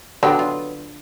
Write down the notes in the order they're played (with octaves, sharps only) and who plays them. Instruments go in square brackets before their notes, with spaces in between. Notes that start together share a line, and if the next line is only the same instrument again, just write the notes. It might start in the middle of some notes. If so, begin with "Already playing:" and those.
[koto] D3 D4 [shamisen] F#3 B3 G5
[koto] F4